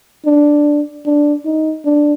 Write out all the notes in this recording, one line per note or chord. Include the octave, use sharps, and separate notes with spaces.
D4
D4
D#4
D4